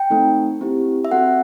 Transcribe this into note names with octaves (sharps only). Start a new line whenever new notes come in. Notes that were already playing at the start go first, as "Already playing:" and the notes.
Already playing: G5
A3 C4 D#4 A4
C4 E4 G4
E5
C4 F#4 A4 F#5